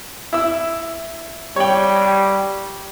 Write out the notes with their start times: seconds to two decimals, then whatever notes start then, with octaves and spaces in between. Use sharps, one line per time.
0.33 E4 E6
1.56 G3 C#5 G5